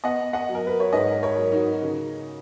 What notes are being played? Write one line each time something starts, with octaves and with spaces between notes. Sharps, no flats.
B3 D#5 F#5
D#5 F#5
F#3
A#4
B4
C#5
G#2 B4 D#5
A#4 C#5
F#3
D#4 F#4
C#3